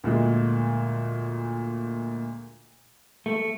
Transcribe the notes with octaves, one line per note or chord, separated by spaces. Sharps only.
D2 A#2 G#3
A3